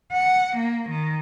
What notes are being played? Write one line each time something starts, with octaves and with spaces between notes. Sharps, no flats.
F#5
A#3
D#3